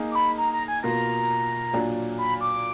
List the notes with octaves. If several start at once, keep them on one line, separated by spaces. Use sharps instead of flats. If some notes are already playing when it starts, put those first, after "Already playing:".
Already playing: A#3 D#4 G#4 D#5
D6
B5
A#5
A#5
G#5
B2 A#3 F4 A#4 A#5
A#2 F#3 A#3 D4
B5
D6